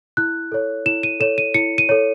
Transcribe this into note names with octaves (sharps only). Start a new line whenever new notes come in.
E4 F#6
A4 C#5
E4 E7
D#7
A4 C#5 E7
D#7
E4 C#7
D#7
A4 C#5